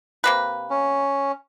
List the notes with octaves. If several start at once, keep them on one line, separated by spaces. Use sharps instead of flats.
C3 A#3 B4
C#4